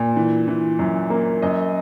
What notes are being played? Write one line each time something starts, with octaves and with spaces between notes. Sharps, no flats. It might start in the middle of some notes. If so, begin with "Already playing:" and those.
Already playing: A#2
E3
E3
F#2
A#3
F#2 D#5